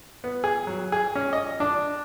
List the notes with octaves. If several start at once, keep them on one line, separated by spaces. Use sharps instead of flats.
B3
G#4
F#3
G#4
C#4
D#5
D4